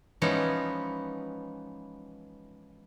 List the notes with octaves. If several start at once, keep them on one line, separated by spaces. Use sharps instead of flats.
E3 F3 G#3 B3 C#4 D#4